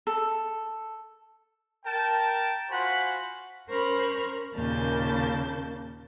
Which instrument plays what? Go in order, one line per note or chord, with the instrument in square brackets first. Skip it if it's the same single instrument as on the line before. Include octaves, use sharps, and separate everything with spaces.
[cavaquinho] A4
[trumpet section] A#4 G5 A5
F4 F#4 C5 F#5 G#5 B5
[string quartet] C#4 A#4 C5 B5 C#6 F6
D#2 A#2 C#3 A#3 A5 G6